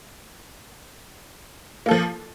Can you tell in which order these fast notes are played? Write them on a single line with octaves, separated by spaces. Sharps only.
A#3 A4 F3